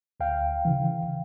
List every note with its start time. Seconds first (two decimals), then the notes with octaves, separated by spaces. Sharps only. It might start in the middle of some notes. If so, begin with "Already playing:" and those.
0.20 D2 F5 G5
0.65 C#3 E3